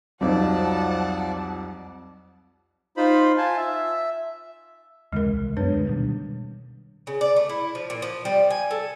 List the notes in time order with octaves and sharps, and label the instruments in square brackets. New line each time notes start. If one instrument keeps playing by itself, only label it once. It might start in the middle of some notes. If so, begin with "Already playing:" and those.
[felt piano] C2 F2 [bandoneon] F3 D5 [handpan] F#3 D#4 [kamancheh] F#5 A5
[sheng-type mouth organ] D#4 F4 C5 B5
F4 G#5 A5
E5
[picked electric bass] D#2 C#3 E3 [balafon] G#3 A#4
[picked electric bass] C2
[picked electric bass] F#2 B3 [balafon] D4 B4 C#5
[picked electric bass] D2 G#3
B2 D#3 G3
[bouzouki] C#3
D5
A3
E4
F3
A#2
F3
G3
G#5
A4